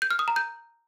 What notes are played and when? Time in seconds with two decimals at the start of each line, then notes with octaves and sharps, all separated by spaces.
0.02 G6
0.11 F6
0.19 D#6
0.28 A#5
0.36 G6